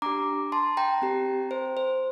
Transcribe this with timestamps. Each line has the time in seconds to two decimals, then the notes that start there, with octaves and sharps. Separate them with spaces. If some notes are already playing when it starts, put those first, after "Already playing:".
0.02 D4 G4 A#5 D6
0.52 A5 C6
0.77 G5 A#5
1.02 C4 G4
1.51 C5
1.77 C5